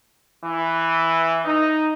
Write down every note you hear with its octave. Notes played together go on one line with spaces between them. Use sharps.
E3
D#4